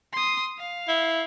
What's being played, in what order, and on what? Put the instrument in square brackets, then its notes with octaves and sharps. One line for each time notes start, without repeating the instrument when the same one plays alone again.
[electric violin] C6 D#6
F5
[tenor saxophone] E4